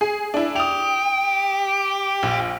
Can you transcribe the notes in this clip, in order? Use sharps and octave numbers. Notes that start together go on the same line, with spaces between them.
G#4
D4 E4
G4 D#6 F7
A#1